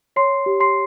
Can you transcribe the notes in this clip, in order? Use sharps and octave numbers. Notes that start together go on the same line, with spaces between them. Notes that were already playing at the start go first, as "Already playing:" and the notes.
C#5 C6 C7
G4
C6 C7